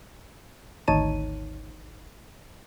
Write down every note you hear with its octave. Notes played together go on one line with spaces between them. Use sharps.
G#1 D2 D#4 C#5 A5 D#7